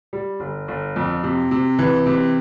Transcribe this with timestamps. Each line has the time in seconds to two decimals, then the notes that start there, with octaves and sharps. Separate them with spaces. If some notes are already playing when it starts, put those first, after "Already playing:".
0.13 G3
0.40 G1
0.68 G1
0.96 F2
1.23 C3
1.51 C3
1.79 E3
2.06 C3